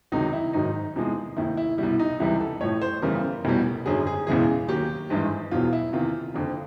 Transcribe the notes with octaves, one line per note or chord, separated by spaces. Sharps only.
C#2 C3 D#3 F#3 D#4
E4
G#1 G#2 D#3 F#3 D#4
E2 C3 F3 G#3
F1 D#2 D#3 E4
E4
C2 B2 G3 E4
D#4
C#2 C3 E3 G3 E4
A4
A1 A2 F3 C#5
C5
G1 F2 C#3 E3 G3 A#4
F1 E2 B2 G3
G#1 F#2 D3 F#3 G#4
G#4
E1 E2 C#3 E3 G#3 G#4
D#2 D#3 F#3 G4
G#1 G2 E3 G#3
E1 E2 B2 F#3 F4
E4
E2 C3 D#3 F4
F#1 F2 D3